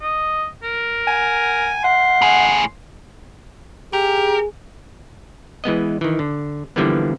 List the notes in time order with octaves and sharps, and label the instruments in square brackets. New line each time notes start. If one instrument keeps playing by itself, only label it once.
[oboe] D#5
A#4
[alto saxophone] G#5
[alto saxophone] F#5 [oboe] C6
[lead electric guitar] A2 G#4
[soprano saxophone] G4 [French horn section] G#4 [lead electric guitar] A#4
[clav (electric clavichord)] E3 G#3 B3 D#5
D#3 E3
D3
D3 E3 F3 G3 A#3 B3